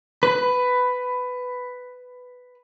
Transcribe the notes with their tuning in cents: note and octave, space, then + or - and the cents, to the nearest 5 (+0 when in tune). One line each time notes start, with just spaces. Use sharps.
B4 +10